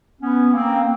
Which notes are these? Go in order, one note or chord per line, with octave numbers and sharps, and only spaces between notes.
B3 C#4
A#3 C4